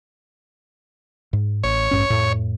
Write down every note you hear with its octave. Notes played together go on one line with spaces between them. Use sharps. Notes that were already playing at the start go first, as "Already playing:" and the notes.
G#2
A1 C#5
A1 G2 C#4
F2 A2